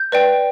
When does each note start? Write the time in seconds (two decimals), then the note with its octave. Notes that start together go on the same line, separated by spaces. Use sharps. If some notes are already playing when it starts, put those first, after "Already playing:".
Already playing: G6
0.12 B4 D5 G5